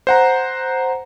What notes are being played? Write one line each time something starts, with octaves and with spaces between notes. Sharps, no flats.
C5 F#5 A#5